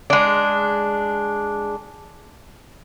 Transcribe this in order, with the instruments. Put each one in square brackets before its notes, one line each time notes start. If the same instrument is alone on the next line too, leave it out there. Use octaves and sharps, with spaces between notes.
[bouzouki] G#3 D4